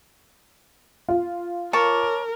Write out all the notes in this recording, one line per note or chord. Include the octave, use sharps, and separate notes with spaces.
F4
A#4 C#5 A5 D6